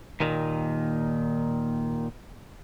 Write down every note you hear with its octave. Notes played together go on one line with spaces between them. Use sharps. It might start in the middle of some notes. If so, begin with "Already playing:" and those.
D#2 A#2 D#3